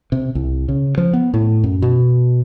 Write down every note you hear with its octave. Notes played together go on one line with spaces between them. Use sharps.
C3
C2
C#3
F3
B3
A2
F#2
B2